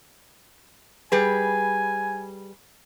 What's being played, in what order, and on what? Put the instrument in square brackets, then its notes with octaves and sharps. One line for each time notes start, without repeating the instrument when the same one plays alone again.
[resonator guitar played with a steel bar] G3 G#4 B4 [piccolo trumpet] G#5